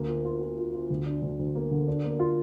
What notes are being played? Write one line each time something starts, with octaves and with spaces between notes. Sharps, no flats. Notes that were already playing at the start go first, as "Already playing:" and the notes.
Already playing: D2 A#3
F4
F4
F4
F4
F4
D2
D4
D2
D2
A#3
D3
D4
A#3
F4